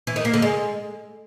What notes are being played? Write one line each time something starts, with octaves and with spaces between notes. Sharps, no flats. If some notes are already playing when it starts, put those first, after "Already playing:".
E3
D#3
A#3
D3
G#3